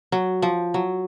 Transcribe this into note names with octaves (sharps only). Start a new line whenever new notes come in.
F#3
F3
F#3